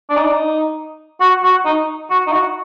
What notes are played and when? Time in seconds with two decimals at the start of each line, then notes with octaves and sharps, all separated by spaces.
0.10 D4
0.17 D#4
0.25 D4
0.32 D#4
1.21 F#4
1.43 F#4
1.65 D#4
2.10 F#4
2.27 D#4
2.32 F#4